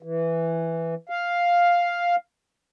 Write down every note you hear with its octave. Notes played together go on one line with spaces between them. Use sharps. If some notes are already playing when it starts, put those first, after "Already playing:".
E3
F5